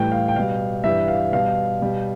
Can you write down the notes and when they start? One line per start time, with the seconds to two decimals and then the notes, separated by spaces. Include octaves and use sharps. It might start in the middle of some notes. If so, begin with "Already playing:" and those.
Already playing: A2 E3 G3 G5
0.12 F5
0.28 G5
0.36 B2 G3 F5
0.84 G2 E3 G3 E5
1.08 F5
1.32 B2 G3 F5
1.82 B2 G3